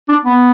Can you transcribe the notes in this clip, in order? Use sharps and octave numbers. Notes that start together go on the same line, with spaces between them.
D4
B3